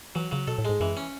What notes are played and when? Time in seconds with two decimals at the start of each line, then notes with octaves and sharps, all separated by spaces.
0.15 E3 F#3
0.31 C#3 F#3
0.48 B2 A4
0.58 A2
0.65 G#2 G#3
0.80 F#2 E3
0.97 C#4